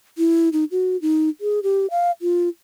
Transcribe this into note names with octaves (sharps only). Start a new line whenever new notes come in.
E4
D#4
F#4
D#4
G#4
G4
F5
F4